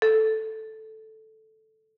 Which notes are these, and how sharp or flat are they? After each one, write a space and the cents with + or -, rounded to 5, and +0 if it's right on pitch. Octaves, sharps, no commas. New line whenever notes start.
A4 -5